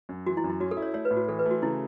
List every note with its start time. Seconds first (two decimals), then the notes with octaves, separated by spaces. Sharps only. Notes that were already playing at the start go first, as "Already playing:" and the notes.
0.09 F#2
0.26 E3 F#4
0.37 E4
0.44 F#2
0.49 E4
0.60 C#4 F#4
0.71 A4
0.77 E4
0.82 C#5
0.94 A3 C#5
1.05 B4
1.11 A2
1.17 F#4
1.29 E3 A4
1.39 B4
1.46 A3
1.51 F#4
1.62 C#3 E4